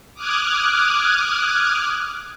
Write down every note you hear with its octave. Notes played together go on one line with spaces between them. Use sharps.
D6 D#6 F6 F#6 G#6